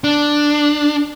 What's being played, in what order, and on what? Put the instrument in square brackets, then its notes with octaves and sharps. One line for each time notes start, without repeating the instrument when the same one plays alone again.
[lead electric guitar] D4